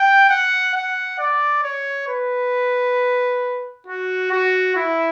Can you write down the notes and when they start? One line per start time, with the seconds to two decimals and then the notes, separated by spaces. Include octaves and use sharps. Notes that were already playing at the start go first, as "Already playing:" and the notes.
Already playing: G5
0.30 F#5
0.74 F#5
1.18 D5
1.63 C#5
2.08 B4
3.87 F#4
4.31 F#4
4.76 E4